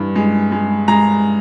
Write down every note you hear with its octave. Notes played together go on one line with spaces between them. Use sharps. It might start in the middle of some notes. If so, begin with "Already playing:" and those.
Already playing: G2 E3
G#3
G#3
G#3 A#5